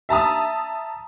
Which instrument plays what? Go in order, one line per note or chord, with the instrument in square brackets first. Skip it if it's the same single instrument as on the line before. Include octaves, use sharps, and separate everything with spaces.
[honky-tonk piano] E5 A5 A#5 D#6